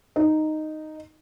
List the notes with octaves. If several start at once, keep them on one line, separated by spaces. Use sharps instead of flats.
D#4